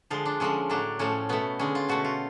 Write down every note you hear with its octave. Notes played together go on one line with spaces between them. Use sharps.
D3 F3 G#3 F4
D4
D3 F3 G#3 C#4
A2 F#3 A3 D4
A2 F3 A3 C#4
B2 A3 B3
D3 G#3 C#4
F4
B2 A3 F#4
F4